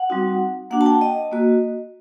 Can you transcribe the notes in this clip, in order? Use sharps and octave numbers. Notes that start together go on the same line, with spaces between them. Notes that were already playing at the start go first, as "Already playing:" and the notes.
Already playing: F#5
G3 C4 D#4 F#4
A#3 D4 F#4 F#5
A5
G5
D#5
A#3 F#4